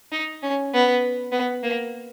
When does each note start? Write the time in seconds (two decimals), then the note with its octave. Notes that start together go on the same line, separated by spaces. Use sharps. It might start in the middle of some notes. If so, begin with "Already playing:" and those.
0.12 D#4
0.43 C#4
0.73 B3
1.32 B3
1.63 A#3